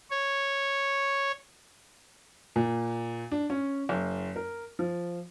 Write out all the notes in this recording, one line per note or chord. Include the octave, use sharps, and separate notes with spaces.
C#5
A#2
D4
C#4
F#1
A#4
F3